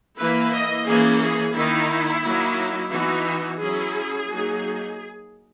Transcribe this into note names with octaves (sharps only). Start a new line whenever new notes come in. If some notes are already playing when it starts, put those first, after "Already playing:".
E3 A#3 E4 B4
D#5
E3 A#3 C#4 G#4
G#4
D#3 A#3 D#4 E4
F#3 A#3 D#4
E3 B3 D#4 F#4
F#4
F#3 C#4 E4 G#4
F#3 A#3 D#4